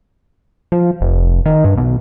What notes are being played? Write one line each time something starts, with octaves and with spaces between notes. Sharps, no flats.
F3
F1
D#3
G2
B1